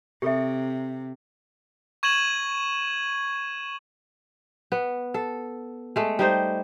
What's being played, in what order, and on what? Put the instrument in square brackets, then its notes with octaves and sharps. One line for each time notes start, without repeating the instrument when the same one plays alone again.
[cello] C3 [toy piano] G4 A4 E5
[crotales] C#6 G#6 D#7 E7 F#7
[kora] B3
A4
G#3 A3
G3 D#4 C5